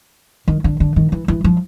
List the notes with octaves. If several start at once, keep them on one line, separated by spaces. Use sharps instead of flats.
D#3
D3
D3
D#3
E3
E3
F3